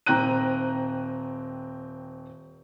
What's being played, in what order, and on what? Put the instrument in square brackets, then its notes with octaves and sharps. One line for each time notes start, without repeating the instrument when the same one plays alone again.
[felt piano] D#1 C4 G5 A#5 F#6 D#7